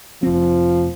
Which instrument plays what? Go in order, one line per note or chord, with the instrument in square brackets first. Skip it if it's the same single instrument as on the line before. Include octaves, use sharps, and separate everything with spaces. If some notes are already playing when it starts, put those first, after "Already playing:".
[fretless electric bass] F1 C4 [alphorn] F3